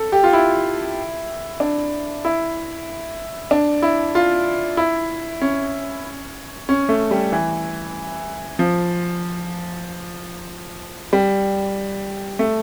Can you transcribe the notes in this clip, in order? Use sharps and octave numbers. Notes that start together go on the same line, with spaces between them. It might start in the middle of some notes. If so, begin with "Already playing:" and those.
Already playing: A4
G4
F4
E4
D4
E4
D4
E4
F4
E4
C#4
C#4
A3
G3
E3
F3
G3
A3